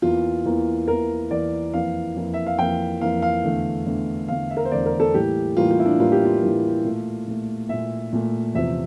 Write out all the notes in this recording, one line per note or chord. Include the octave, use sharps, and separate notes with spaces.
E2 E3 A#3 F4
E2 E3 A#3
E2 E3 A#3 A#4
E2 E3 A#3 D5
F2 E3 A#3 F5
F2 E3 A#3
E5
F5
F2 E3 A#3 G5
F2 E3 A#3 F5
F5
E2 D3 A3
E2 D3 A3
E2 D3 A3 F5
E5
A#4
C5
E2 D3 A3 D5
A#4
A4
A2 E3 G3 A#3 G4
A2 E3 G3 A#3 F4
F4
E4
D4
A2 E3 G3 A#3 F4
G4
F4
A2 E3 G3 A#3
A#2 A3
A#2 A3
A#2 A3 E5
A#2 A3
E2 C3 F3 E5